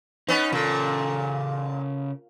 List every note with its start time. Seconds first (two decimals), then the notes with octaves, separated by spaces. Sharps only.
0.29 B3 C#4 D#4
0.52 A#2 C#3 A4